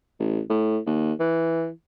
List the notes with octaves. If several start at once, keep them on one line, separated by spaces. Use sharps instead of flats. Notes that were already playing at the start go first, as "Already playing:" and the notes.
A1
A2
D#2
E3